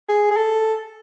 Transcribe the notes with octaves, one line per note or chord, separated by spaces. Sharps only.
G#4
G#4
A4